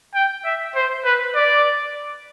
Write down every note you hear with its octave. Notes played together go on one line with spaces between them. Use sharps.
G5
E5
C5
B4
D5